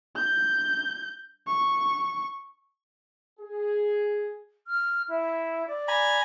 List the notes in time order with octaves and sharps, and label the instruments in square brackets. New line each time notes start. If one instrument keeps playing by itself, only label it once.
[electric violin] G6
C#6
[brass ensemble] G#4
[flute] F6
E4
D5
[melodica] G#5 A#5 B5